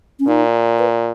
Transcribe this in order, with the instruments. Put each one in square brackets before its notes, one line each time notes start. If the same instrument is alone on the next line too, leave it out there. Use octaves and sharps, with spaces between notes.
[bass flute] C#4
[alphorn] A#2 [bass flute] D#4
[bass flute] B4